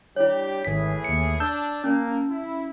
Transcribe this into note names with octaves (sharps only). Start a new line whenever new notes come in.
G3 D4 E4 G4 C#5
G#1 A2 E3 G#4 B6
D#2 C#7
D4 A5 E6 G6
A#3 C#4
E4